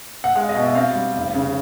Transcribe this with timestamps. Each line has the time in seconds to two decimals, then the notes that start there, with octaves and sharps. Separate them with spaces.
0.24 F#5
0.35 G#3 F5
0.49 D#5
0.55 B2
0.62 E5
0.75 C4 F5
0.95 G3
1.15 F1
1.35 C#3